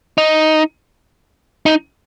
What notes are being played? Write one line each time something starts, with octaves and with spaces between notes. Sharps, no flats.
D#4
D#4